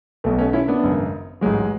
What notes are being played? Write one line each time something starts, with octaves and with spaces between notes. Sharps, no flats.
B1 B2 F#3 A3
A3 C#4
C#4 E4
B3 D4
G#1 F#2 C#3
A1 G#2 F#3 G#3